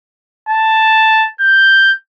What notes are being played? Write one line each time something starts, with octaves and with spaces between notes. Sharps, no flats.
A5
G6